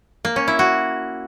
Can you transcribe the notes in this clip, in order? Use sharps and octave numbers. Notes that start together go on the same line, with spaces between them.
A#3
C#4
E4
F#4